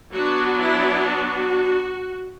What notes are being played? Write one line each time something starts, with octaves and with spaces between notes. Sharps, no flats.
F#3 B3 D4 F#4
E4
F#4